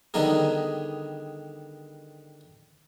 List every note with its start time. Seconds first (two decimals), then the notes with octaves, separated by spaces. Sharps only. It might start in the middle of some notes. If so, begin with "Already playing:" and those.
0.14 D3 D#3 G3 B3 D#4 G#4